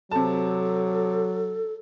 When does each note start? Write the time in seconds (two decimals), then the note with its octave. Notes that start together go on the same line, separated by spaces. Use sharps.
0.11 C3 F#3 A4 A5